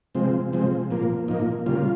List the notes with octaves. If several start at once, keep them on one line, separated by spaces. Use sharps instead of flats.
C3 F3 G#3 C4
C3 F3 G#3 C4
A#2 F3 A#3
A#2 F3 A#3 D#4
C#3 G3 A#3 F4